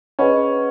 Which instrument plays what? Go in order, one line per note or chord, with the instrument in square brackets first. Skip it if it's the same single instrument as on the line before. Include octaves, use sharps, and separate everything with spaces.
[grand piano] C#4 [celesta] G#4 B4 D#5 F#5 B5